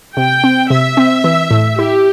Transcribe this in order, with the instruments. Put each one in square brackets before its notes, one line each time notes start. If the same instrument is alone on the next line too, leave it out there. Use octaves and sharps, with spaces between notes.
[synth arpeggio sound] C3 [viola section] G5
[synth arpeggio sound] C4
[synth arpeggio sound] C3 [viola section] E5
[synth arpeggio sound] C4
E3
A2
[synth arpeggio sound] E4 [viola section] G4